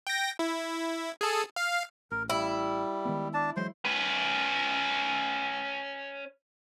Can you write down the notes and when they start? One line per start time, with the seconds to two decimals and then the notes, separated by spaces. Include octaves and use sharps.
0.07 G5 A#6
0.39 E4
1.21 G#4 A4
1.56 F5
2.11 A1 A#4
2.30 G3 E4
3.05 D#3 G#3 B3
3.34 D4 A5
3.56 E3 F#3 G#3 C5 C6
3.85 C#4 B4